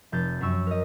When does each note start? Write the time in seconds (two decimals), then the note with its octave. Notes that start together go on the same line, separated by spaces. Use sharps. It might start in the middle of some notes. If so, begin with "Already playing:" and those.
0.12 F1 G6 A6
0.40 F#2 F#3 C#6 E6
0.67 A#4 D#5